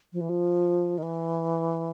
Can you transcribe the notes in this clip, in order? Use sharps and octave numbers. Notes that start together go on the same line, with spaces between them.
F3
E3
F3
D#3
E3